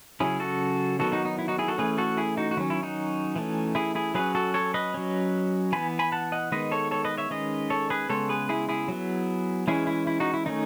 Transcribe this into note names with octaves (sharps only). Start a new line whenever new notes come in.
C#3 F#3 C#4 E4 G#4
F#4 A4
D#3 F#3 B3 F#4 A4
D#4 F#4
D#4
E4
D#4 F#4
E4 G#4
F#4 A4
E3 A3 C#4 G#4 B4
F#4 A4
E4 G#4
D#4 F#4
F#4
D#3 F#3 C#4 E4
E4
D#4 F#4
E3 A3 C#4
E4 G#4
E4 G#4
F#3 C#4 G#4 B4
F#4 A4
A4 C#5
B4 D#5
F#3 C#4
E3 B3 G#5 B5
G#5 B5
F#5 A5
D#5 F#5
D#3 G#3 B3 B4 D#5
A4 C#5
A4 C#5
B4 D#5
C#5 E5
D#3 G#3 C#4 B4 D#5
A4 C#5
G#4 B4
C#3 G#3 B3 A4 C#5
G#4 B4
E4 G#4
E4 G#4
F#3 B3
E3 G#3 C#4 E4 G#4
E4
E4
D#4 F#4
E4
D#3 A3 C#4 D#4